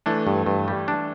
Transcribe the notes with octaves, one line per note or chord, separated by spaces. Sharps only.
E3 A3 D4
G2
G2
G3
D4